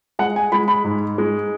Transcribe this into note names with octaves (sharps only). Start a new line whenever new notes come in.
G#3 F#5
G#5
G#3 B5
B5
G#2
G#3